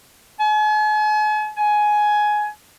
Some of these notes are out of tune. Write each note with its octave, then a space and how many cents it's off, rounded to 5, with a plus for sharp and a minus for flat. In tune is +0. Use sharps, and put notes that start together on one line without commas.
G#5 +45
G#5 +15